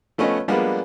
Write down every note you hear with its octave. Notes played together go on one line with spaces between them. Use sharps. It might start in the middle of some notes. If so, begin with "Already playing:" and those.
F3 A3 B3 C#4 D#5
F3 G3 G#3 A#3 B3 D4